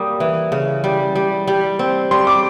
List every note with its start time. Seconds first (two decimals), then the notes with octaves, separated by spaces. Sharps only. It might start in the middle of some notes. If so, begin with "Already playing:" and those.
Already playing: G3 A#3 D#6
0.20 E3
0.52 C#3
0.84 G3
1.15 G3
1.47 G3
1.79 C4
2.11 G3 C6
2.27 D6